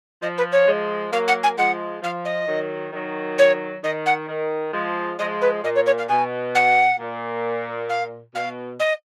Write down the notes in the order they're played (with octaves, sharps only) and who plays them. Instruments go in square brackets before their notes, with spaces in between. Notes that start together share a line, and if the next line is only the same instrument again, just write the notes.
[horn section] F3 [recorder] D#5
[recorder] B4
C#5
[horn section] F3 G#3
[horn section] F#3 A#3 [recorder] F5
[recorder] F#5
G#5
[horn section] F3 G#3 [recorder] F#5
[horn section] F3 [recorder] F5
[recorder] D#5
[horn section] D#3 F#3
D#3 F#3
[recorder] C#5
[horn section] D#3 [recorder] D#5
[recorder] F#5
[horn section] D#3
F3 G#3
[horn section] F3 G#3 [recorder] D#5
[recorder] B4
[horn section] A#2 [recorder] D#5
[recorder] C#5
C#5
F5
[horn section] B2 [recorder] G#5
[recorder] F#5
[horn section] A#2
[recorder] F5
[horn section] B2 [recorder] F5
[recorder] D#5